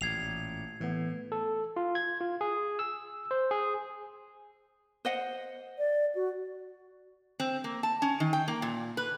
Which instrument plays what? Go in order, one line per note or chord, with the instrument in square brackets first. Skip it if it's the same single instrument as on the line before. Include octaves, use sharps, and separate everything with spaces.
[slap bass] A1 A#2 [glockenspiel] G#6 C7 F7
[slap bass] A2 [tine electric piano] E3 A3 B3
[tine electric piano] A4
F4
G#6
F4
G#4
E6
C5
G#4
[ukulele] C5 D#5 F#5
[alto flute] D5
F#4
[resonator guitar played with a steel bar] C4
A#3
A5
C#4
D#3
G5
A#3
A#2
B4